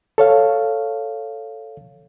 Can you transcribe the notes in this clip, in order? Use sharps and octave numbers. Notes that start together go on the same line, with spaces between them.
A4 C#5 F5